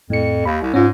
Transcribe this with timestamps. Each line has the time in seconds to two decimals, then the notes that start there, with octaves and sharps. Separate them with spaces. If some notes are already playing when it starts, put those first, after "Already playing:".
0.10 F2 A2 C#7
0.45 D#2 B5
0.62 C2
0.74 G#2 C#4 F4